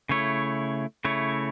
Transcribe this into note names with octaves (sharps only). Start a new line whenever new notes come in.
C#3 A3 E4 C#5
C#3 A3 E4 C#5